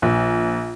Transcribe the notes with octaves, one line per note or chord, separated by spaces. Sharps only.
A#1